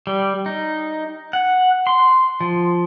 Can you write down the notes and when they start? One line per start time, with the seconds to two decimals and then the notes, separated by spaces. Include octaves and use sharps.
0.07 G3
0.46 D#4
1.33 F#5
1.87 C6
2.41 F3